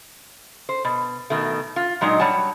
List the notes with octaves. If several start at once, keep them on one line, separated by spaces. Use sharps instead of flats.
C5
B2
B2 D#3 A3
F4
A#2 F#3 G#3 D4 D#4
F#3 G3 C#5 F#5 A5